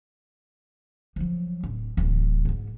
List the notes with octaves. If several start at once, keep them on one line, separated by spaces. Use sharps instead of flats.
F3 F#3
D1
D1 E2
G#2 B2